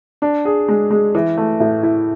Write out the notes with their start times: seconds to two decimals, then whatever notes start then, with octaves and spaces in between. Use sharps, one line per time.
0.22 D4
0.45 G#4
0.68 G#3
0.90 G#3
1.15 E3
1.37 A3
1.60 A2
1.83 E4